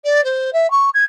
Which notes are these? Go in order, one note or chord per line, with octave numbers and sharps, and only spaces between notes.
D5
C5
E5
C#6
G#6